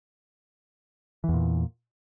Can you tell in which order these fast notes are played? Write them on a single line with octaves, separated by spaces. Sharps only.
E3 E2 A#2